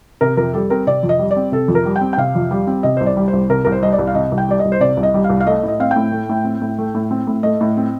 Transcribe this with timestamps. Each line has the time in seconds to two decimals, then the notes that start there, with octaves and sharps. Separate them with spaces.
0.21 C3 A#4
0.37 F2 A#4
0.53 G3 A4
0.70 C4 A#4
0.87 C3 D5
1.03 F2
1.09 D#5
1.19 G3
1.31 D5
1.36 C4
1.52 C3 A4
1.68 F2
1.75 A#4
1.86 G3
1.96 G5
2.01 C4
2.13 G5
2.18 C3 F5
2.35 F2
2.51 G3
2.67 C4
2.83 C3 D#5
2.97 C2 C5
3.06 D5
3.17 G3
3.28 C5
3.33 C2
3.50 C3 A#4
3.65 C2 A#4
3.72 C5
3.82 G3 D#5
3.93 D5
3.99 C2
4.07 F5
4.15 C3 D#5
4.32 C2
4.38 G5
4.49 G3 D5
4.59 D#5
4.65 C2
4.72 C5
4.80 C3 D5
4.97 C2
5.03 D#5
5.14 G3
5.24 F5
5.30 C2
5.40 F5
5.46 A3 D#5
5.63 A2 D#5
5.80 C4 F5
5.91 G5
5.96 A2
6.12 A3
6.29 A2
6.45 C4
6.61 A2
6.79 A3
6.94 A2
7.11 C4
7.27 A2
7.43 A3 D#5
7.61 A2
7.77 C4